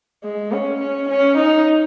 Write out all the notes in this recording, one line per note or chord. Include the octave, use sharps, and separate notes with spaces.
G#3
C#4
C#4
C#4
D#4